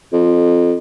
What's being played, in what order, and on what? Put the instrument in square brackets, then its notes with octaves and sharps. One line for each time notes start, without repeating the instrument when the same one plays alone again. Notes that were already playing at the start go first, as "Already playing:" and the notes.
[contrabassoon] F2